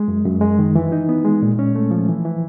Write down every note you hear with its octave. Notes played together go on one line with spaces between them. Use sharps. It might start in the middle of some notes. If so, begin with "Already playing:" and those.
Already playing: G#3
F#2
F#2
G#3
D#3
E3
D#4
B3
G#3
A#2
C#4
A3
F3
E3
E3